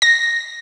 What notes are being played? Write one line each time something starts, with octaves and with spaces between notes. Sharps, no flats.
A#6